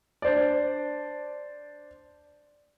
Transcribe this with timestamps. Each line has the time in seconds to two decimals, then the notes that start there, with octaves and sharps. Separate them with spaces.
0.22 D4 C5 D5